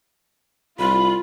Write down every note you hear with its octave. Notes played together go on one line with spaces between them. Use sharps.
C2 F4 B5